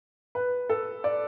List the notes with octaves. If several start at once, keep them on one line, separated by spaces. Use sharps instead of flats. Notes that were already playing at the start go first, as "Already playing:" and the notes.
B4
A4
D5